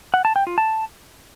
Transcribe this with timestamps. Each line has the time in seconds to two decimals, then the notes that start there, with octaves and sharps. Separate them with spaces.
0.14 F#5
0.25 A5
0.36 G5
0.47 F4
0.58 A5